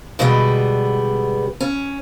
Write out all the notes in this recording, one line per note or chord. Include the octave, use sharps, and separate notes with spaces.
B2 D3 G3 G#3 B3
C#4